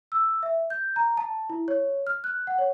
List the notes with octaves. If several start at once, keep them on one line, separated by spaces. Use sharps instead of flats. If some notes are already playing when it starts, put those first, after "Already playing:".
E6
E5
G6
A#5
A5
E4
C#5
F6
F#6
F#5
C#5